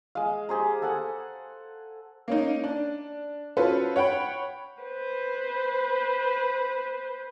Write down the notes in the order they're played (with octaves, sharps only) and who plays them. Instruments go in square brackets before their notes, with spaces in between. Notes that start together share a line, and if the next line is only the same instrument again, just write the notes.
[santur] G#3 F5
G4 G#4 C5 A#5
A4 F#5 G#5
[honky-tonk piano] A#3 C#4 D#4
D4
C#4 F4 F#4 A4 B4 C5
C#5 F#5 G5 B5
[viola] B4 C5